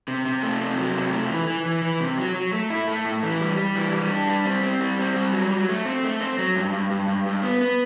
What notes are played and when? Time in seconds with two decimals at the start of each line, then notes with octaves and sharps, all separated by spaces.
0.08 C3
0.26 C3
0.43 A3
0.60 C3
0.78 F#3
0.95 C3
1.13 A3
1.31 E3
1.47 E3
1.66 E3
1.82 E3
2.00 C3
2.18 F#3
2.35 F#3
2.53 A3
2.70 E4
2.87 A3
3.05 A2
3.23 E3
3.41 G3
3.58 G3
3.76 E3
3.93 G3
4.11 D4
4.28 G3
4.46 C4
4.63 C4
4.81 G3
4.99 C4
5.16 G3
5.33 F#3
5.51 F#3
5.69 A3
5.86 C4
6.04 A3
6.21 C4
6.38 F#3
6.56 G2
6.73 G2
6.91 G2
7.08 G2
7.26 G2
7.43 B3
7.61 B3